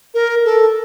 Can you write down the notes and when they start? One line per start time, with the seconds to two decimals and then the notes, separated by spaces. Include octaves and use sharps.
0.14 A#4
0.45 A4